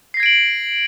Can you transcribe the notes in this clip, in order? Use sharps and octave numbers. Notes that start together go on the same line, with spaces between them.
G#6 A#6 C7 D7 F#7